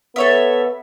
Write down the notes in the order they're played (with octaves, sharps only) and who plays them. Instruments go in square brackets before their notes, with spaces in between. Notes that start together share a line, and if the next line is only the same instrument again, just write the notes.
[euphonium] B3 [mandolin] A4 C#5 E5